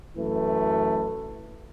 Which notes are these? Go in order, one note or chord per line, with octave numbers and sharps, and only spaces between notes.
F#2 E3 A3 B4